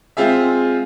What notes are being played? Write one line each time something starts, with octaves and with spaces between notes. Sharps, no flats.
G#3 C4 F4 G#4 E5